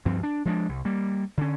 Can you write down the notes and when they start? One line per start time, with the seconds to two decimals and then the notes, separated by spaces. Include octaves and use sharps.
0.05 D2 G2 F3 C4
0.23 D4
0.45 F3 G#3 D4
0.69 C2
0.85 G3 A#3
1.37 D3 C#4